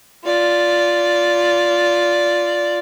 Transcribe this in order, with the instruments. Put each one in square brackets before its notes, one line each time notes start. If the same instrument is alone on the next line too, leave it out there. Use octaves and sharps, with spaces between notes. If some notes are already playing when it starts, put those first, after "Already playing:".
[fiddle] F4 D5